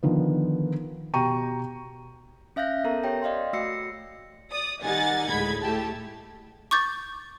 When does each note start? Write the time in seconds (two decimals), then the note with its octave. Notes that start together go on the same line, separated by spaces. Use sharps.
0.03 D3 D#3 F3 B3
1.14 B2 G4 G5 A#5 C#6 D#7
2.56 C#4 E5 F5 F#6 G6 A#6
2.84 B3 A4 A#4 A#5
3.03 G4 C#5 G5 A#6
3.22 D5 D#5 F5 G5 C6
3.53 A3 F#4 E6 A#6 C7 C#7
4.51 D5 D#6
4.83 D#3 G3 D#4 F#5 G#5 A6
5.29 D2 A2 G#3 B5 G#6
5.62 A2 A3 G4 A5
6.71 C#6 D6 G6 A6